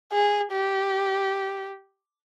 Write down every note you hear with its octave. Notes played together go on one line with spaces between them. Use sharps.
G#4
G4